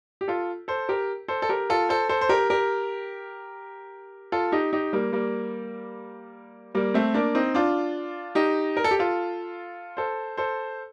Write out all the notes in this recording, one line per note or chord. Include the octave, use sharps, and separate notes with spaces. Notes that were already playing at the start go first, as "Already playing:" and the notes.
G4
F4 A4
A4 C5
G4 A#4
A4 C5
A4
G4 A#4
F4 A4
A4 C5
A4 C5
C5
G4 A#4
G4 A#4
F4 A4
D#4 G4
D#4 G4
G3 A#3
G3 A#3
G3 A#3
A3 C4
A#3 D4
C4 D#4
D4 F4
D#4 G4
A#4
A4
G4
F4 A4
A4 C5
A4 C5